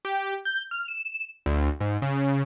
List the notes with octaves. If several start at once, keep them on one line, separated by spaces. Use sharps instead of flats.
G4
G6
F6
E7
D2
G#2
C#3